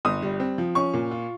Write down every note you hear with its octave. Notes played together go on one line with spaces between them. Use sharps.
G1 D#6
G3
C4
F3
C#4 C#6
A#2
F4